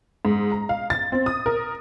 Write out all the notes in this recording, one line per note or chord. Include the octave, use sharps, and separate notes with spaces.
G#2
A#5
F5
A6
C4
D#6
A#4